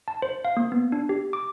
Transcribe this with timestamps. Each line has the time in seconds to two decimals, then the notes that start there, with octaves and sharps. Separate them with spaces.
0.08 A5
0.22 C5
0.45 F5
0.57 A#3
0.72 B3
0.92 D4
1.09 G4
1.33 D6